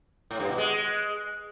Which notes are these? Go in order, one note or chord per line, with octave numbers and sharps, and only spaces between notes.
A2
G2
B2
G#3